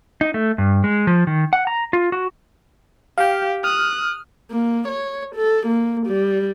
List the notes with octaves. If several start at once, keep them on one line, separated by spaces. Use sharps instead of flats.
D#4
A3
G2
G#3
F3
D#3
F#5
A#5
F4
F#4
G4 F5 G5
D#6 F6 F#6
A#3
C#5
A4
A#3
G3